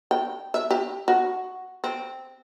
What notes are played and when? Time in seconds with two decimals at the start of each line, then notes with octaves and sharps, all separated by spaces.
0.11 G5
0.54 E5
0.71 G4
1.08 F#4
1.84 C4